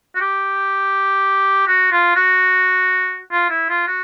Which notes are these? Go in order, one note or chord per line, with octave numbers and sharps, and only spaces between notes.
F#4
G4
F#4
F4
F#4
F4
E4
F4
F#4